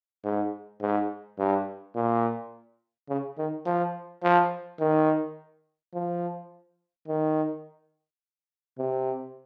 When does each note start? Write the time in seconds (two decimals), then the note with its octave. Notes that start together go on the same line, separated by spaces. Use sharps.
0.24 G#2
0.81 G#2
1.38 G2
1.95 A#2
3.09 C#3
3.38 D#3
3.66 F3
4.23 F3
4.80 D#3
5.94 F3
7.08 D#3
8.78 C3